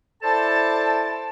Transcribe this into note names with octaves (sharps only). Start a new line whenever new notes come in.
E4 A4 C5 D5 A5